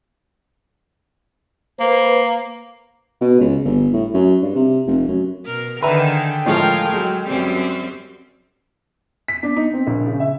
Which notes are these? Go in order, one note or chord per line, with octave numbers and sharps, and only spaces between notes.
A#3 B4 C5
B2
C#2
G1
A2
F#2
G2
C3
F1
F#2
B2 A#4
D3 D#3 G#4 A4 B4 E5 G5 A#5
A2 F3 G#3 F4 A#4
F#3 G#3
F#2 G3 C4
B6
D4
D#4
C4
A#1
C#3
E5